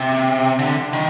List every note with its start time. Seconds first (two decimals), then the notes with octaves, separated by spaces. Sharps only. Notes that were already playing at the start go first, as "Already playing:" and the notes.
Already playing: C3
0.59 D3
0.93 D#3